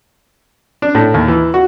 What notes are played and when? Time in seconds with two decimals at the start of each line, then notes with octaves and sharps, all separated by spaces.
0.82 D4
0.95 A2
1.14 D#2
1.28 E3
1.54 F#4